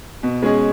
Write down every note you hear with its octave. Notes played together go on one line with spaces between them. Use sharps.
B2
G#3 C#4 G#4